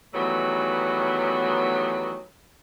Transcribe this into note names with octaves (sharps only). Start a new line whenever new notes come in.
D#3 E3 F#3 G3 A3 B3